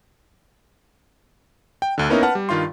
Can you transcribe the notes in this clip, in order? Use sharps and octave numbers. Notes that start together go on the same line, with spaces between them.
G5
D2 D3
A#3 B3 C#4 D#4 E4 A#4
B4 F#5 A5 F6
G3
G2 D#3 F4 F5 C6